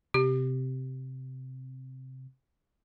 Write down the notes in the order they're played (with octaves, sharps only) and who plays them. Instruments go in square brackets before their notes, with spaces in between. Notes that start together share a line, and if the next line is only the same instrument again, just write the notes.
[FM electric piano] C3 [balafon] G4